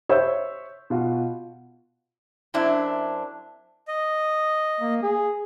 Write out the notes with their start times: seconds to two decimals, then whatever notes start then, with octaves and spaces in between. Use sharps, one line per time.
0.09 C5 C#5 E5 E6 G6
0.90 B2 F4 F#4
2.54 F#2 C4 D4 E4
3.88 D#5
4.81 A#3
5.03 G#4